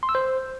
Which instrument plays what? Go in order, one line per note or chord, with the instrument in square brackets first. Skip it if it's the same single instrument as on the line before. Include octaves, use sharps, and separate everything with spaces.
[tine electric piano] C6
E6
C5